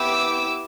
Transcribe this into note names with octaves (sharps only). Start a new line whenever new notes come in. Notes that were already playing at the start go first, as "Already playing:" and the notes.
Already playing: B3 E4 G4 D6 E6